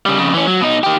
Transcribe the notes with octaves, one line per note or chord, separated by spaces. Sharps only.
C#3 G3
F2 C#3
E3 C#4
F#3
B2 D#4
D#3 G4